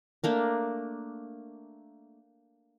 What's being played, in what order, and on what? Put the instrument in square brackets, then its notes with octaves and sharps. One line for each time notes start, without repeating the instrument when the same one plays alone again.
[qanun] A3 A#3 D4